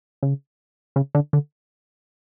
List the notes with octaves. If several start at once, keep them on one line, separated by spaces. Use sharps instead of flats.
C#3
C#3
D3
D3